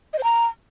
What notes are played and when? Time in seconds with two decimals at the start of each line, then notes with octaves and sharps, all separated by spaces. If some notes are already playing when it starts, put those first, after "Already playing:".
0.13 D#5
0.18 C5
0.24 A#5